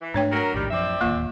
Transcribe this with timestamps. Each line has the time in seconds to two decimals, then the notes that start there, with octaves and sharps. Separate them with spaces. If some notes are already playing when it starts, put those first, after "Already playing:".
0.01 E3
0.14 G#2 A3 D4 C#5 G5
0.30 F#3 A#4
0.54 A#1 D#2 A2 D#3 G3
0.71 F#2 E3 F3 C4 D5 E5
1.01 D1 D#2 A#3 F4